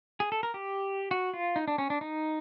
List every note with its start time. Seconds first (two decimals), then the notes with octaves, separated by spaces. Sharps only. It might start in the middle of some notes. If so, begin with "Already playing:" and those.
0.20 G#4
0.32 A4
0.43 A#4
0.54 G4
1.11 F#4
1.34 F4
1.56 D#4
1.68 D4
1.78 C#4
1.90 D4
2.01 D#4